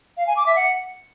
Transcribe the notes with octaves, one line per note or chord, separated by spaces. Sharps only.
F5
G#5
D6
E5
F#5